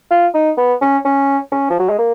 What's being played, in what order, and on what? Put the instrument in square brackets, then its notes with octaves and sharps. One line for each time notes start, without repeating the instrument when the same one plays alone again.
[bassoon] F4
D#4
B3
C#4
C#4
C#4
F3
F#3
G#3
A#3